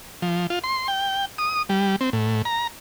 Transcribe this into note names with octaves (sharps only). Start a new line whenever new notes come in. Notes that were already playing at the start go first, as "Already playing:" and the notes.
F3
F4
C6
G5
D#6
G3
C4
A2
A#5